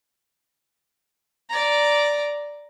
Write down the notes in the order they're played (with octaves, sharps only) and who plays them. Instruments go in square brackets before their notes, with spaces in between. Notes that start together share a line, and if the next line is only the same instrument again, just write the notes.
[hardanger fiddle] D5 A#5